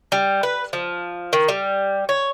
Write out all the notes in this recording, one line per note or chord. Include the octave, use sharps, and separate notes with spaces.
G3
B4
F3
D#3
G3
C#5